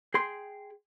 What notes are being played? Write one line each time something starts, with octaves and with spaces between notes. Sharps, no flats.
G#4 G5 C6